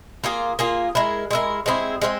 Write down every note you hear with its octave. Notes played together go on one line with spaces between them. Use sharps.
A#3 F4 G#4
A#3 F4 G#4
G#3 E4 A#4
G#3 E4 A#4
G#3 C4 E4 G#4
G#3 C4 E4